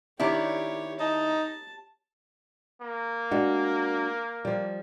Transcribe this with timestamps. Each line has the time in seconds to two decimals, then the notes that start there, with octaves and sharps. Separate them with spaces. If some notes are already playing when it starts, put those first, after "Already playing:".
0.20 D#3 D4 E4 G4 C#5
1.00 D#4 A5
2.82 A#3
3.31 G#3 D4 F#4
4.45 F3 G3